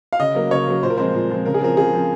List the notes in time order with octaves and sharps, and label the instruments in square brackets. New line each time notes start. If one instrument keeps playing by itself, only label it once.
[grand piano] F5
C#3 D#5
F#3 A#3
C#3 C#5
F#3 A#3
A#2 C5
A#4
F3 G#3 C4 C5
A#2
F3 G#3 C4
C#3 A#4
G#4
F3 C4 A#4
C#3 G#4
F3 C4